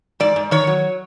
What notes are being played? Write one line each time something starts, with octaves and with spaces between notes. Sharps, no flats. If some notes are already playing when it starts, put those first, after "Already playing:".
G#2 D5
G#2
D#3 C#5
F#3